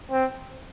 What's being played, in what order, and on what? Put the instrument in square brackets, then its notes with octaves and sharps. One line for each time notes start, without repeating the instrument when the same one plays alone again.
[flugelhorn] C4